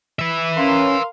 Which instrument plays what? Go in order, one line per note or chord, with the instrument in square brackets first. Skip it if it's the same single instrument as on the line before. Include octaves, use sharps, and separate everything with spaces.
[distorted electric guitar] B4 E5
[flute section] C#4 [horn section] A#4 F5 C6